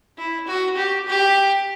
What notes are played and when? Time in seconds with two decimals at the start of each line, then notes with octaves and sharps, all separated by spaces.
0.18 E4
0.47 F#4
0.77 G4
1.07 G4